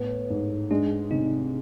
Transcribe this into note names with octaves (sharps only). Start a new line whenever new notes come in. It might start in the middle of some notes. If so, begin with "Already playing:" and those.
Already playing: A2 B3
G#2
G#3 D4
C3 D#4